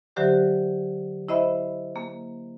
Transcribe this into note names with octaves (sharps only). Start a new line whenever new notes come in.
D3 F#3 G4 C5 E5
E4 C5 D#5 E5 B5
A#3